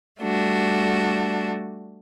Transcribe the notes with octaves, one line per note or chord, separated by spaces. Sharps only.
G3 A3 D4 F#4